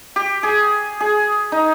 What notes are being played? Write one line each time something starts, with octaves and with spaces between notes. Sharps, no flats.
G4
G#4
G#4
D#4